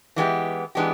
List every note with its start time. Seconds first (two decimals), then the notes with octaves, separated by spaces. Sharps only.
0.16 E3 G#3 B3 D4 G4
0.75 E3 G#3 B3 D4 G4